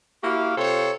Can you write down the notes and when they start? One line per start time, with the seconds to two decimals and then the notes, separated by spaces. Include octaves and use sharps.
0.23 A#3 E4 F#4 G4 F5
0.57 C3 F4 A4 C5 C#5